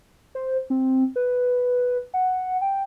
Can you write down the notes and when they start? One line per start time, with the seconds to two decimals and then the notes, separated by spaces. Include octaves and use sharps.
0.35 C5
0.70 C4
1.16 B4
2.14 F#5
2.61 G5